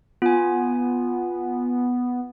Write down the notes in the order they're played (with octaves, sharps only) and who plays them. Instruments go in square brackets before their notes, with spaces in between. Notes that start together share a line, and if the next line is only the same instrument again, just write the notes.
[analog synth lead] B3 [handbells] F4 G#5